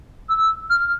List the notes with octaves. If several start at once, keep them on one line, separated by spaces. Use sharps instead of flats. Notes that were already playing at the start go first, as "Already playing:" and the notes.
E6
F6